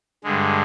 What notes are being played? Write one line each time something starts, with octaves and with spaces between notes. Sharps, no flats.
G2 D3 G#3